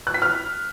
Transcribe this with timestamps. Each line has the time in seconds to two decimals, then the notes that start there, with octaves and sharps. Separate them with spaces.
0.07 F#6
0.14 B6
0.22 F6